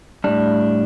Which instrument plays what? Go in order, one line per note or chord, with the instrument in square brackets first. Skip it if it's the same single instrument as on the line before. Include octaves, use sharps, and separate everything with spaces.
[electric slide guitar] A2 G3 D4